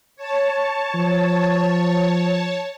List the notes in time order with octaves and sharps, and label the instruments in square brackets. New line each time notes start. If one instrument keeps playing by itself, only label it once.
[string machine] C#5 A5
[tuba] F3